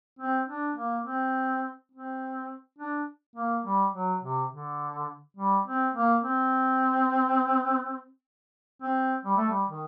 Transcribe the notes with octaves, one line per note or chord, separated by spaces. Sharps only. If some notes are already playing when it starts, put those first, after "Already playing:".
C4
D4
A#3
C4
C4
D4
A#3
G3
F#3
C3
D3
G3
C4
A#3
C4
C4
G3
A3
G3
D#3